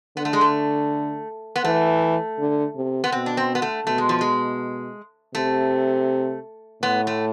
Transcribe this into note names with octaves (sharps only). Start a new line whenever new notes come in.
D3 B3
A3
G#3
A3
B3
E3 A3
D3
C3
B3
B2 C4
D4
C4
B3
A3
B2 A3
G#3
F3
G#3
C3 A3
A2 B3
A3